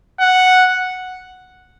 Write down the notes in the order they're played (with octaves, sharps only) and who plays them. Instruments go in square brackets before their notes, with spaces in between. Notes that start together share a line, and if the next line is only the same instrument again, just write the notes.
[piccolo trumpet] F#5